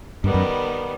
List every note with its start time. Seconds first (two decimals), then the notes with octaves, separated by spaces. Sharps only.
0.23 G2 D#3 G3 B3
0.34 F#2